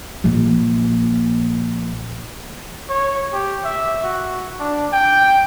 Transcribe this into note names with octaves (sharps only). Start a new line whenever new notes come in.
A#1 A#3
C#5
G4
E5
F#4
D4
G5